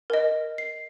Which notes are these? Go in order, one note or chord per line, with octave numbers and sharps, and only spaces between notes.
A#4 D#5
C7